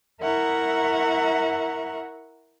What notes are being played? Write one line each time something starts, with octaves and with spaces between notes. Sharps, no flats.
E4 A#4 E5 F#5 A#5 C#6